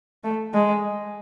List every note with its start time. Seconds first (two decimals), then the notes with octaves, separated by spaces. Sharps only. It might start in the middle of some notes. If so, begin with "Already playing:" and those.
0.24 A3
0.54 G#3